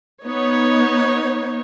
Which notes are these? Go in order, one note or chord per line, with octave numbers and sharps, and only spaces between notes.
B3 D#4 C#5